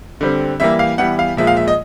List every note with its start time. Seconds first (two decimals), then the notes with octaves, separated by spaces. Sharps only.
0.21 D3 G3 C4
0.60 E3 G3 A#3 E5
0.79 F5
0.98 E3 G3 B3 F#5
1.19 F5
1.37 A#2 F3 G#3 E5
1.47 F5
1.57 E5
1.68 D#5